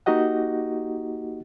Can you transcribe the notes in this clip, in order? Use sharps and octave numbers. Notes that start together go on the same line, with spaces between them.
A#3 D#4 F#4 G4 D#5 F#5